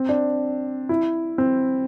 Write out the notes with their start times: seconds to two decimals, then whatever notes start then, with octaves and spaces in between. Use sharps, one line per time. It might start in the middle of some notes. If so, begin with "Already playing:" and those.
Already playing: C4
0.09 D4
0.89 E4
1.38 C4